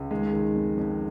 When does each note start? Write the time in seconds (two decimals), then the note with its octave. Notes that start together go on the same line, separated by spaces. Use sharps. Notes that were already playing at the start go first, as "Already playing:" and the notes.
Already playing: C#2
0.11 D#3 G#3
0.33 D#3
0.55 F2
0.77 F2